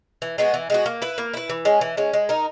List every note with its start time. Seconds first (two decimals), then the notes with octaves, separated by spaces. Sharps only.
0.22 E3
0.38 G#3 B3 F#4
0.54 E3
0.70 G#3 B3 F#4
0.86 A#3
1.02 E4 B4
1.18 A#3
1.34 E4 B4
1.49 E3
1.65 G#3 C#4
1.81 E3
1.97 G#3 C#4
2.13 G#3
2.29 D#4 A#4